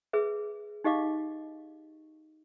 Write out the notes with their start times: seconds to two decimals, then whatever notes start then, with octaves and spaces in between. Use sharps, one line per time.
0.13 G#4 B4 E5
0.84 D#4 G4 D#5 F5 D6